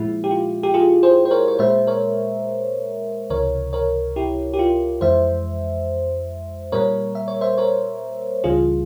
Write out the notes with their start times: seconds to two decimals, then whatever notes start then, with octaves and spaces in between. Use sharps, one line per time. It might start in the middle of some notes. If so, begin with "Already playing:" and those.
Already playing: A#2 F3 G#3 E4
0.24 G4
0.31 F4
0.63 G4
0.74 F4 G#4
1.03 G#4 C5
1.25 C5
1.31 A#4 C#5
1.48 C#5
1.59 A#2 G#3 C5 E5
1.87 A#4 C#5
3.30 C#2 C3 E3 A#4 C#5
3.73 A#4 C#5
4.16 E4 G4
4.54 G4
4.59 F4
5.01 F2 E3 G#3 C5 E5
6.72 A#2 G3 A#3 A#4 C#5
7.15 E5
7.28 C#5
7.41 C5 E5
7.58 A#4 C#5
8.44 C#2 C#3 E3 G3 F4 G#4